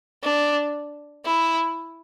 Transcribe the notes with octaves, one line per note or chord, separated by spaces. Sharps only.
D4
E4